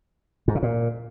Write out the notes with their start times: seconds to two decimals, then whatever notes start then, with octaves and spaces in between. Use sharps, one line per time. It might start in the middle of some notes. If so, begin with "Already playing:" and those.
0.48 G#2
0.55 C#3
0.63 A#2